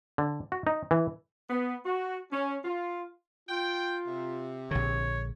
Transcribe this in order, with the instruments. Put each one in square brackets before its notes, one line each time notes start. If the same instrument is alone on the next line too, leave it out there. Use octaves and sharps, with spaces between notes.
[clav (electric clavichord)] D3
F#4
D#4
E3
[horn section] B3
F#4
C#4
F4
[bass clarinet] F4 [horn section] G5
[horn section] C3
[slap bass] A#1 D3 [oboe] C#5